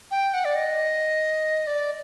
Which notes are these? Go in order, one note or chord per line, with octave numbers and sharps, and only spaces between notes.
G5
F#5
D5
D#5
D5